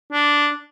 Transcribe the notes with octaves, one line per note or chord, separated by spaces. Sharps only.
D4